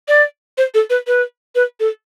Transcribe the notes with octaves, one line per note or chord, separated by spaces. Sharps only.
D5
C5
A4
B4
B4
B4
A4